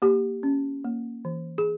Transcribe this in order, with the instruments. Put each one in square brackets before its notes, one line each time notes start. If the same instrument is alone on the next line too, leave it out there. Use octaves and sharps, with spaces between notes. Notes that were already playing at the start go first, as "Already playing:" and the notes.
[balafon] A#3 G4
C#4
A#3
E3
G#4